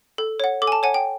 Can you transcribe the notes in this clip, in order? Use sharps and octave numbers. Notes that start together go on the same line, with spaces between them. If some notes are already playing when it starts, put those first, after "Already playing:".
A4
C#5 F#5
A4 D6
G#5
A5
C#5 F#5 G#5
G5